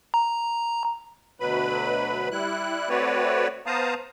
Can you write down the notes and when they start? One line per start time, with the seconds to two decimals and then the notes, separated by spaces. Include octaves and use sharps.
0.14 A#5
1.40 D2 B2 F#3 B4 B5
2.31 G3 E4 F#6
2.89 A3 C4 F#4 B4 C#5 D5
3.66 B3 C5 F5 A5 A#5 D#6